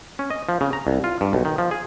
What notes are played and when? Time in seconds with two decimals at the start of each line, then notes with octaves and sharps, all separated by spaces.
0.19 C#4
0.31 D#5
0.49 F3
0.61 C#3
0.73 A#5
0.87 C2
1.04 F4
1.21 G2
1.33 B1
1.45 D#3
1.58 F3
1.71 G#4